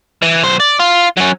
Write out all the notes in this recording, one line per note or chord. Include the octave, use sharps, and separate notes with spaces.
E3
B1 C5
D5
F4
F#3 C#4